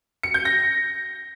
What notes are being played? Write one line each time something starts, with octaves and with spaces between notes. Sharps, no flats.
C#7
G6
A#6